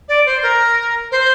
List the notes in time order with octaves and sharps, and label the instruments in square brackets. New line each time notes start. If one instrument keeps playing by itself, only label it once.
[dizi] D5
C5
A#4
C5